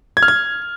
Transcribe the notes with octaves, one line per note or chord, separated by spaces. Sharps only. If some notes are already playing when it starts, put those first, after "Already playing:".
G#6
F6
G#6